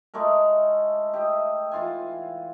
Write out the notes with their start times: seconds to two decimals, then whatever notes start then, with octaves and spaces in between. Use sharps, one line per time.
0.14 G#3 A3 E4 A#4
1.13 G4 D#5 E5
1.72 E3 F4 G#5